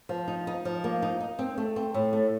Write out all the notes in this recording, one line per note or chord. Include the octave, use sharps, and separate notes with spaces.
F3
D#4
D#4
F3
A#3
D#4
D#4
C4
A3
C4
A2
A3